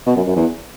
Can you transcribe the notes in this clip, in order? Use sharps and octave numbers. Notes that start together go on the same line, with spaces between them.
B2
F#2
F#2
E2